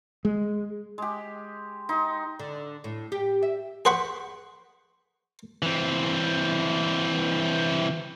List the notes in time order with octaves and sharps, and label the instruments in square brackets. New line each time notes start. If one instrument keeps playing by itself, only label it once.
[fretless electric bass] G#3
[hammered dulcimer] G#3 G4
D#4 C6
[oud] D3
A2
G4
E5
[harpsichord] G#4 C5 F#5 B5 C#6
[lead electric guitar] E3 C4